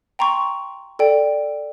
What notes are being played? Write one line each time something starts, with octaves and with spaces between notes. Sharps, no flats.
G5 A#5 C6 C#6
A4 D5 G5